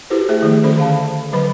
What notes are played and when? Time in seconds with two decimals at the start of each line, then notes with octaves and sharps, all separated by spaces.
0.10 E4 F#4 G4 A4 B4 C5
0.29 A3 G#4 C5 E5
0.43 D#3 F3 A3
0.63 D#3 A3 C#4 G#4 A4 C5
0.78 D3 F5 A5
1.33 D3 F#3 B4 B5